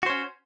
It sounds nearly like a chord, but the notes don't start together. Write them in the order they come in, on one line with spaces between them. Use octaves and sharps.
F#4 C5 C#4